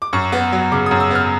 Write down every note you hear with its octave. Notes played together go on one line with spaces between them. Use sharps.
D6
F#2 C#6
B3
F#3
C#3 D6
D#6
F#2
E6
B3 F6